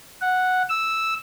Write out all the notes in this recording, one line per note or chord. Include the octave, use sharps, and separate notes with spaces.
F#5
E6